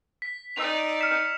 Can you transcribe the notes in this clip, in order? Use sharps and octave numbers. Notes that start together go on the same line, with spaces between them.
B6
D#4 D5 E6 B6 F7
F6 B6 C#7 E7